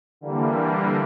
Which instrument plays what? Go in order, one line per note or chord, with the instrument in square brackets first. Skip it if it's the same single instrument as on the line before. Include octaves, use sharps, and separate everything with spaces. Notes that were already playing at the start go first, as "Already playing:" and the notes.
[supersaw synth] D3 E3 G3 A#3